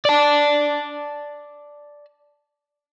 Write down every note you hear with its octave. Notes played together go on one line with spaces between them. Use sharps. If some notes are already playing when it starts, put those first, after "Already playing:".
D5 A5